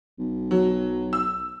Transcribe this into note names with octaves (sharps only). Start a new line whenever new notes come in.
B1
F#3
E6